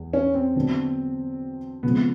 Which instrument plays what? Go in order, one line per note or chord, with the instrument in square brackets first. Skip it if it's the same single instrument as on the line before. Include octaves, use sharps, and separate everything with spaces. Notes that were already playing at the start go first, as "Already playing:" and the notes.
Already playing: [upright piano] E2
[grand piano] C#4
C4
[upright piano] D3 F#3 B3 D4 F#4
[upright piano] C#3 F3 G#3 C4 [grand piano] B3